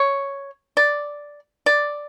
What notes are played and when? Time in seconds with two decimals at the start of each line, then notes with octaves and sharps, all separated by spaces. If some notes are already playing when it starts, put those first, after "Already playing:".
Already playing: C#5
0.77 D5
1.66 D5